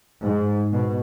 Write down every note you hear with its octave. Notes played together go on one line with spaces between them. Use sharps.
G#2
B2